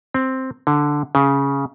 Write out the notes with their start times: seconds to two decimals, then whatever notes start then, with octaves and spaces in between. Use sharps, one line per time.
0.14 C4
0.67 D3
1.15 C#3